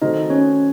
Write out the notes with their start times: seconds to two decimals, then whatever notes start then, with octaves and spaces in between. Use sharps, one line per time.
0.02 D#3 A3 C4 D#4 F#4 C5 D#5
0.30 C#4 C#5